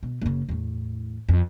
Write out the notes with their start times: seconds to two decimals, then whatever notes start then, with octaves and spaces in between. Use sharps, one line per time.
0.03 B2
0.22 F#1 C#3
0.49 E2 A2
1.29 F2